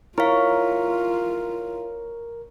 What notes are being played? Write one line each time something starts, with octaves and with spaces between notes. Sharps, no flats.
E4 F4 A#4 C#5 F5